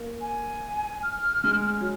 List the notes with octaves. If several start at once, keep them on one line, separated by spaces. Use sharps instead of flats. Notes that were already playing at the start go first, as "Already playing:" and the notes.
Already playing: A#3
G#5
F6
G#3
F#3